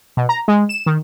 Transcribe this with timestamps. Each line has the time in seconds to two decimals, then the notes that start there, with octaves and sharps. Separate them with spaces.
0.17 B2
0.29 A#5
0.48 G#3
0.69 E7
0.86 D#3